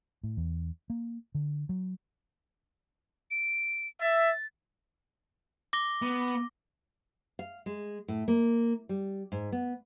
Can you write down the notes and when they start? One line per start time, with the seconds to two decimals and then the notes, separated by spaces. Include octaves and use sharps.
0.23 A2
0.37 E2
0.90 A#3
1.35 D3
1.69 F#3
3.31 D7
4.01 E5 A6
5.73 D6 A#6 G7
6.02 B3
7.39 F5
7.66 G#3
8.08 A2
8.28 A#3
8.89 G3
9.32 G#2
9.52 B3